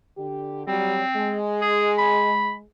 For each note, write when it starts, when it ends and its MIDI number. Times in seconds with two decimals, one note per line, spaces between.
0.18 0.66 50
0.18 0.66 67
0.68 1.02 54
0.68 1.02 55
0.68 1.36 60
1.17 2.64 56
1.62 1.92 68
1.98 2.53 83